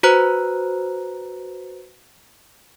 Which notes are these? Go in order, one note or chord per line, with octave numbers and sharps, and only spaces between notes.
F#4 B4 C5 A#5 F#6